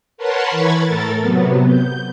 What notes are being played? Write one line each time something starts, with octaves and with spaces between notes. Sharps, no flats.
A#4 B4 C#5 F#5 A5 C6
E3 B5 C#6 G#6 A6
A2 A4 A#4 A6
C3 F#3 B3
G6